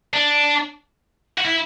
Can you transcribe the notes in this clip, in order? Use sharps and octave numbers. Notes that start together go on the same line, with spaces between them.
D4
F#4
E4